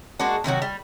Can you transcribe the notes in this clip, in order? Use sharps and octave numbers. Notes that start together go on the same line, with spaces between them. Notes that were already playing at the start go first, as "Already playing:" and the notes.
G#3 A#3 D4 F#4
C3 D#3 F#3 F#4
G3